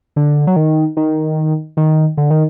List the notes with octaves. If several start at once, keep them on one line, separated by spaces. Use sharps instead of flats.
D3
F#3
D#3
D#3
D#3
D3
D#3